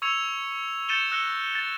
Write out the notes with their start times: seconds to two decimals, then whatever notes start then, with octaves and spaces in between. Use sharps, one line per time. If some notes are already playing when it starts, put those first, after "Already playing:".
0.02 C#6 E6 G#6 C#7 F7
0.89 G6 A6 C#7 D#7 E7 G7
1.12 E6 F#6 A#6 C#7 G7
1.55 A6